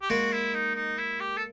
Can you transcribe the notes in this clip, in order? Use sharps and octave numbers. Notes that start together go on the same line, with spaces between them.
G4
G#3 A#3 F#4
E4
D#4
D#4
E4
G4
A4